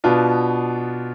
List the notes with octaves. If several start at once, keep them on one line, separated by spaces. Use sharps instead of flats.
B2 B3 D4 F4